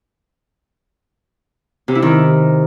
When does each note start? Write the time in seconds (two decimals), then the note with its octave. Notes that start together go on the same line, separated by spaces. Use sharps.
1.88 C3
1.95 E4
2.02 D#3